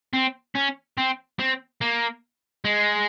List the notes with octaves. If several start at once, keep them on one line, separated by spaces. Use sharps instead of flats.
C4
C#4
C4
C4
A#3
G#3